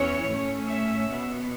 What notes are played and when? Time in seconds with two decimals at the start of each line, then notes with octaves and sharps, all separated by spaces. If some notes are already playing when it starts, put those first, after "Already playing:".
Already playing: E2 E3 C#4 C#5
0.27 A2 A3 C#4
0.68 E5
1.09 B2 B3